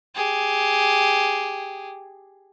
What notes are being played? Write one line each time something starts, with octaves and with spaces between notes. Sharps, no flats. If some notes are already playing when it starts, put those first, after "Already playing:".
G4 G#4